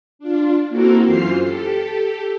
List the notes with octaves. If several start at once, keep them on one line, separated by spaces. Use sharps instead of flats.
D4 F4
A#3 C4 E4 F#4 A4 A#4
F#2 E3 F4 C5 F6 C7
G4 A4